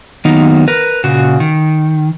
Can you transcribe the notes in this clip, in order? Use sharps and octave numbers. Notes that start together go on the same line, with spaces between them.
D#3 F#3 A#3 B3 D#4
A#4 B4
A#2 C#3 F#4
D#3